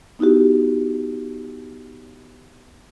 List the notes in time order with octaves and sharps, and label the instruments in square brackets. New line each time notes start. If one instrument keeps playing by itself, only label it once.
[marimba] B3 D#4 E4 F#4 G4